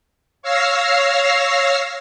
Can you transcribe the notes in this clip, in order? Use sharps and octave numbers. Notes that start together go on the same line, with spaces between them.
C#5 F5 E6 F6 A#6 C7